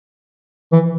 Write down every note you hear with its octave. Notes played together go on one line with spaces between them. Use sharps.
E3